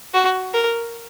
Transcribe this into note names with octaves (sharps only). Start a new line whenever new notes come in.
F#4
A#4